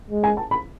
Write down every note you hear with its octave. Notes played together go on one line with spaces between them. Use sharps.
G#3
G#5
A5
B5